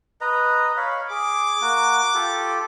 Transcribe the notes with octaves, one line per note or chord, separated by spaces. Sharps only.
B4 D#5 A#5
C#5 F5 B5
G#4 D6
A#3 F#4
F4 G4 A4